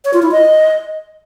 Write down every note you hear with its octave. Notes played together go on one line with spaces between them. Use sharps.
C#5
F4
E4
D#5